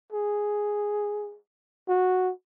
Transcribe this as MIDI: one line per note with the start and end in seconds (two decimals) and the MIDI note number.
0.12 1.37 68
1.88 2.32 66